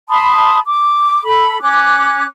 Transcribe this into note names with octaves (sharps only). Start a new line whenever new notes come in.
A5 B5 C6 D#6
D6
A4 B5
C#4 D6 F#6